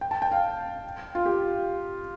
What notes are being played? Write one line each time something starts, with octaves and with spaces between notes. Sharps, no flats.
G5
A5
G5
F5
F4
G4